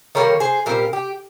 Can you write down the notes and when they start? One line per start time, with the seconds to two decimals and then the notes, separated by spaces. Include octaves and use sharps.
0.15 D#3 G3 A#3 A#4 C#5
0.40 G#4 C5
0.66 A#2 G3 C4 G4 A#4
0.93 G4